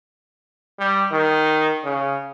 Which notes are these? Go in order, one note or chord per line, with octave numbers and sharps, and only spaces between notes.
G3
D#3
C#3